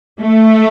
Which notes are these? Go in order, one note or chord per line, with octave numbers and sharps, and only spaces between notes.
A3